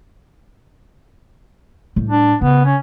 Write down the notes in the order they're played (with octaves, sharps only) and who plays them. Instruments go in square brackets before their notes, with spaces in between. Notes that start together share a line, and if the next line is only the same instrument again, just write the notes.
[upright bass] A2 G3
[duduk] D4
[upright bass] C#3 [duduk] B3
[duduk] C#4